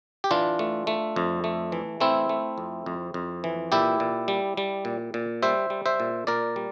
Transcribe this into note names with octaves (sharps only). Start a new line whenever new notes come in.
G4
E3 D4 F4
A3
A3
F2
A3
E3
A3 C4 E4
A3
F2
F2
F2
E3
A#2 E4 G4
A#2
G3
G3
A#2
A#2
G3 C5 E5
G3
C5 E5
A#2
A#2 A#4 D5
G3